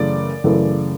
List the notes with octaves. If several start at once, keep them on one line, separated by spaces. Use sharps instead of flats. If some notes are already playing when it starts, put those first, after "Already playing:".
Already playing: F#2 C#3 E3 A3 D5
F#2 C#3 E3 A3